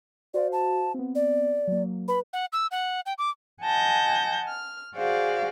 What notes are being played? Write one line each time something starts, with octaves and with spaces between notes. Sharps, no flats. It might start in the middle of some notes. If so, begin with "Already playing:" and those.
F#4 C5 D5 F5
A5
B3 C4
D5
F#3 A#3
B4 B5
F#5
E6
F#5
G5
D6
D#5 F#5 G#5 A5 G6 A#6
F6
F#4 G#4 C5 D5 F5